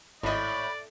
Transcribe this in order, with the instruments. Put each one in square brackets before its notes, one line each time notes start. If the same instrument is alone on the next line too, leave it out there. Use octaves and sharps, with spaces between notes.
[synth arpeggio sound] G#1 D#5 [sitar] A2 [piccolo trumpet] D5 [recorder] B5